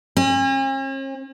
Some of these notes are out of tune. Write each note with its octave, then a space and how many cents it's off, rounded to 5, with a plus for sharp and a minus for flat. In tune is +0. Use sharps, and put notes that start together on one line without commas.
C#4 -45